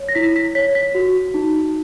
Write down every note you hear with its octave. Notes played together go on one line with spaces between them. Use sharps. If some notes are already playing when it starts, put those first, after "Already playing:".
Already playing: C#5
A#6
E4 B6
B6
C#5 B6
B6
F#4
D#4